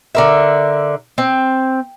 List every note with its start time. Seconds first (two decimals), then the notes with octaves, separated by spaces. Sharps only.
0.15 D3 A#4 E5
1.18 C4